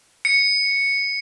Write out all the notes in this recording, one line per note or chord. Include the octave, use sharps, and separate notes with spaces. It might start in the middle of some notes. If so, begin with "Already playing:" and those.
C#7